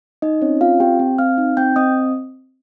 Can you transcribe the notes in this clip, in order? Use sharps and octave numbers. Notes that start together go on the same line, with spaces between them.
D#4 D#5
C4 C#4 C#5
C4 F4 F5
C4 G4 G5
C4
C4 F5 F6
D#4
C4 G5 G6
C4 D#5 D#6